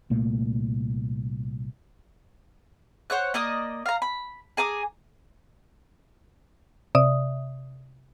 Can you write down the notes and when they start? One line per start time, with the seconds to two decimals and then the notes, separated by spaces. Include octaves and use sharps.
0.10 C2 A#2 A3 A#3
3.10 C5 C#5 F#5 F#6
3.34 A#3 D5 D#5 D#6
3.86 F5 A#5
4.02 B5
4.57 G#4 G#5 A#5 D6
6.95 C3 D5 E5 D#6